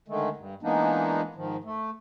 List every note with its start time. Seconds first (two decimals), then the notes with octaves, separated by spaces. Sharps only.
0.08 D3 D#3 G#3 A3
0.37 G2
0.63 E3 G#3 A#3 B3 D4 D#4
1.35 G#2 D#3 F3
1.64 A3